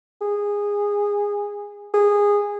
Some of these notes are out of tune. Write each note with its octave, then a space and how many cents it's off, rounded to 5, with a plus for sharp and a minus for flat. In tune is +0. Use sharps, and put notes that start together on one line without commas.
G#4 -20
G#4 -20